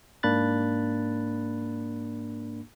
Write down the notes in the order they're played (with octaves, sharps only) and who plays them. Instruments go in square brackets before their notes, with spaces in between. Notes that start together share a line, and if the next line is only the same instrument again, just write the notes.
[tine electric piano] G#2 A#3 D4 B5 F#6 A6